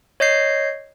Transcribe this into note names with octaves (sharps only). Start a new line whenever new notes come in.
C#5 D#5 G6 C7